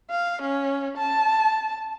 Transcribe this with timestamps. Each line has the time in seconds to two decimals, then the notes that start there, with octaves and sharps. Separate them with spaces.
0.10 F5
0.42 C#4
0.97 A5